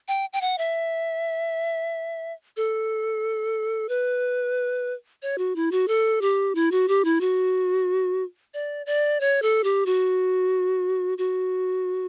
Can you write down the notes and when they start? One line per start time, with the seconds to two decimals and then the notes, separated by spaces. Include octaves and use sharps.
0.08 G5
0.33 G5
0.41 F#5
0.58 E5
2.57 A4
3.89 B4
5.22 C#5
5.38 F#4
5.56 E4
5.72 F#4
5.88 A4
6.21 G4
6.55 E4
6.71 F#4
6.88 G4
7.05 E4
7.21 F#4
8.54 D5
8.86 D5
9.20 C#5
9.42 A4
9.64 G4
9.86 F#4
11.18 F#4